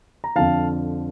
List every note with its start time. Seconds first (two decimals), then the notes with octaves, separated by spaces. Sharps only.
0.24 A#5
0.35 F2 D3 F3 F5 A5